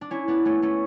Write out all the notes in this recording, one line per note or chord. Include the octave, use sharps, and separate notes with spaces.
D4
C#4 E4
B3 D4
A3 C#4
A3 C#4